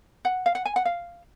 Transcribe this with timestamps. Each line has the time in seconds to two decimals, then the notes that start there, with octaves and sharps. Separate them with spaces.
0.25 F#5
0.46 F5
0.55 F#5
0.65 G#5
0.76 F#5
0.85 F5